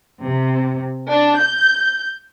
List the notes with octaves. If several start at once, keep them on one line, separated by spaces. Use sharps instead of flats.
C3
D4
G6